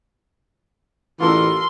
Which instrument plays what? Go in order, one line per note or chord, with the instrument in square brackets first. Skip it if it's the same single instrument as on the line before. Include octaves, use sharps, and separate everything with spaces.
[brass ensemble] A1 [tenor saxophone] E3 [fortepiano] F4 A4 A#4 [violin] C6